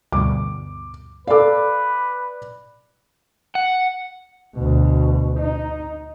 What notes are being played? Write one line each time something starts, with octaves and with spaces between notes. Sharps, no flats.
D2 G2 B2 D6
A4 B4 D5 F5 D6
F#5
D2 B2
D#4